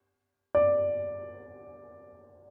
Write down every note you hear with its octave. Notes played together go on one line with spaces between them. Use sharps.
D5